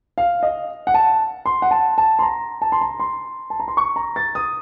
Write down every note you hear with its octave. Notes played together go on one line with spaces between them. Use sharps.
F5
D#5
F#5
A5
C6
F#5
A5
A5
C6
A#5
A5
C6
A#5
C6
A5
A#5
C6
C#6
A#5
A6
D#6